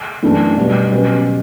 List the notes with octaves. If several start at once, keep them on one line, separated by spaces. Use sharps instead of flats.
F#2 E3 A3 D4 A4
B2 G3 B3
B2 F#3 C#4 G4 B4